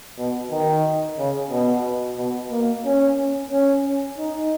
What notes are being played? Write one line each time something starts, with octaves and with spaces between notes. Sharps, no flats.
B2
D#3
C#3
B2
B2
A#3
C#4
C#4
D#4